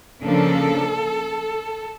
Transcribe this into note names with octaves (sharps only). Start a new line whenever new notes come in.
C#3 F3 A#3 D4 A4